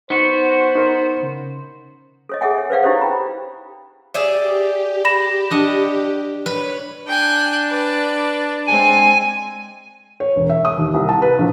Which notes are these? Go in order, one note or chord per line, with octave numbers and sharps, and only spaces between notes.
B3 D#4 F#4 C5
D#4 A#4 D#5
C#3
A4 C#5 D#5
G#4 A4 E5 F#5 G#5
C#5
B4 C5 D5 F5 F#5
D#4 E4 G4 A4 C5 C#5
G5 B5
G4 G#4 D5 E5
B5 A#6 E7
D4 D#5 F#5
B4 C#5
D4 G5 G#5 F#6
B4 D5
G#3 C4 G#5
C#5
E1
E5
D#6
D#2
C2
A5
B4
A#1